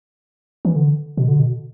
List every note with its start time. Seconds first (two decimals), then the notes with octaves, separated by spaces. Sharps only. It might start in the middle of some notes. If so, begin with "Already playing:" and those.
0.65 E3
0.76 D3
1.17 B2
1.28 D3
1.40 B2